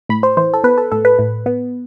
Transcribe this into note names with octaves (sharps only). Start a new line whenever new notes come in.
A2 B5
C5
E3 C5
A4
B3 B4
A4
A2 A4
B4
A2
B3